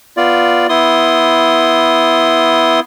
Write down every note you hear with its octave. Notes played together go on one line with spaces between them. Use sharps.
B3 F4 D5
B3 E4 C6 D#6